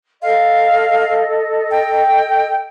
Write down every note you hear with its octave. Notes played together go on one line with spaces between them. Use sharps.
A4 D#5 F5
G5